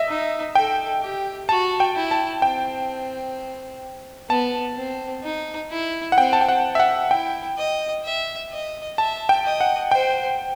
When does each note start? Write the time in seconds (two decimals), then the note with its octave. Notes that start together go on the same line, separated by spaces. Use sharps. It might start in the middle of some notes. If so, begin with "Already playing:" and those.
Already playing: D#5 E5
0.08 D#4
0.55 A4 G5
1.02 G4
1.49 F#4 A5
1.80 G5
1.96 E4
2.11 A5
2.42 C4 G5
4.29 B3 A5
4.77 C4
5.23 D#4
5.71 E4
6.12 F#5
6.17 C4 G5
6.33 A5
6.41 G5
6.49 F#5
6.75 E5
6.80 F#5
7.11 E4 G5
7.58 D#5
8.04 E5
8.52 D#5
8.98 E5 A5
9.29 G5
9.45 D#5
9.60 F#5
9.91 C5 G5